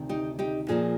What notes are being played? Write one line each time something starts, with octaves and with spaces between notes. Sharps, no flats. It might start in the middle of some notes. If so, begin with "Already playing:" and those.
Already playing: D2 C3 D#3
D#4 G4
D#4 G4
A#2 F3 A#3 F4 G#4